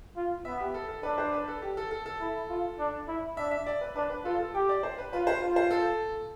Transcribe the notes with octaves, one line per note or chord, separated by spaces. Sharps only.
F4
B3 E5
G4
A4
A4
D4 B4
C5
B4
A4
G4
A4
A4
A4
E4
F4
D4
E4
D4 E5
E5
D5
B4
D4 B4
B4
F4 A4
A4
G4 G5
D5
C5
B4
F4 B4
C5
F4
C5
A4